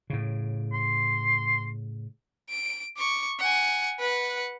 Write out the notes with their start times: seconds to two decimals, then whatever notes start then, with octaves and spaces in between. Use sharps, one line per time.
0.10 A2 C#3
0.73 C6
2.50 D7
2.97 C#6 D6
3.39 F#5 G#5
3.99 B4 F#5